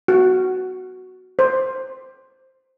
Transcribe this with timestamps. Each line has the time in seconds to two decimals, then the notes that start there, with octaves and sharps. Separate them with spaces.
0.08 F#4
1.39 C5